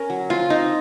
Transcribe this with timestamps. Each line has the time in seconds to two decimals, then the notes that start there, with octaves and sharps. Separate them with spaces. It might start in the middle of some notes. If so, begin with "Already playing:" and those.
Already playing: C#4 A#4
0.10 F#3
0.30 F3 F4
0.50 C4 D#4